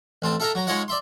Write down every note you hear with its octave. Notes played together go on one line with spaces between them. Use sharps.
A1 C4 A5
A4 E5 F5 G5 A5 A#5
F#3 A#5
G#3 D#4 F4 C#5 D#5 F#5
D5 E5 C6